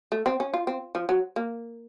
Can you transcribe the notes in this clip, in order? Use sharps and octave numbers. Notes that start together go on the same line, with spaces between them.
A3
C4
C#4
F4
C4
F3
F#3
A#3